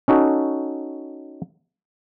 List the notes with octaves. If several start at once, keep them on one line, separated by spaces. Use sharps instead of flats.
C#4 D#4 F#4 A4